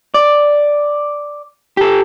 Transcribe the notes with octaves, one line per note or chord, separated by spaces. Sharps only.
D5
G4 A4